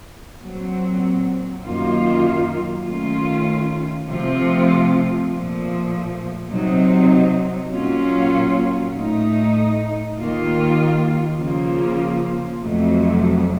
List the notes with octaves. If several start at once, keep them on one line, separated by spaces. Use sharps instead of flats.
A#2 F#3 C4
F#2 D#3 A#3 F4
D#3 A3 C#4 F4
C3 F3 A3 C4 F4
A#2 F3 A3
C3 F#3 C4 D#4
A#2 F#3 A#3 C#4 F4
A2 A3 D#4
D#2 D#3 A#3 F4
C#3 F3 A#3 F4
F2 C3 F#3 A3